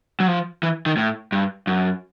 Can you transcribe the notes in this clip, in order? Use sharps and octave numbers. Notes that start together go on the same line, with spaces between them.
F#3
F3
E3
D#3
A2
G2
F#2